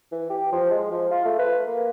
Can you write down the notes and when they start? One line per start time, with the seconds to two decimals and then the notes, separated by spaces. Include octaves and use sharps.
0.12 E3
0.30 G4
0.52 F3
0.71 G#3
0.91 F3
1.11 F4
1.25 A3
1.39 B4
1.67 A#3